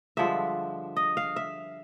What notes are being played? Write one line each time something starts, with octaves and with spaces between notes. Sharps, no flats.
G2 D3 F3 G#3 E5
D#5
F5
E5